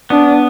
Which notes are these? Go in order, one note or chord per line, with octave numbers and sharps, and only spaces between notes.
B3 D4